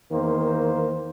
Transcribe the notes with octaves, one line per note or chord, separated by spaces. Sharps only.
E2 D#3 A#3 C5